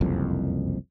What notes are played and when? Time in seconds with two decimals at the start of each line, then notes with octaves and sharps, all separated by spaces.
0.01 F#1 C2 F2